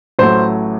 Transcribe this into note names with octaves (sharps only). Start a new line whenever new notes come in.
A1 A2 F#3 A3 C5